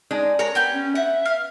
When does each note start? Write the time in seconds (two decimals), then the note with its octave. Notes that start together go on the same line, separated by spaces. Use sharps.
0.11 G#3 D4 D#4
0.39 G#3 A#4 C#5 A#5
0.55 B3 G4 G#5 G6
0.73 C#4
0.95 E5 F#5
1.26 F5